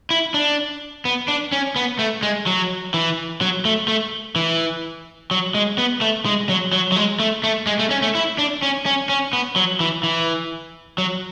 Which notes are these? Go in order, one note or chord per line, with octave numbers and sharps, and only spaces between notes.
E4
D4
B3
D4
C#4
B3
A3
G#3
F#3
E3
F#3
A3
A3
E3
F#3
G#3
B3
A3
G#3
F#3
F#3
F#3
G#3
A3
A3
G#3
A3
C#4
A3
E4
D4
C#4
C#4
C#4
B3
F#3
E3
E3
F#3